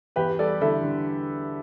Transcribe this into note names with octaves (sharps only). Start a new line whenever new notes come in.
E2 G4 B4
G3 A4 D5
D3 E4 A4
D3